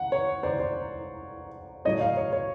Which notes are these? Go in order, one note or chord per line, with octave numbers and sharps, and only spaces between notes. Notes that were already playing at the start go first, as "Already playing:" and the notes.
Already playing: F#5
C#5
C5 D5
C5 D5
A2 F#3 A3 C4 C#5 D#5
D#5 F5
C#5
C#5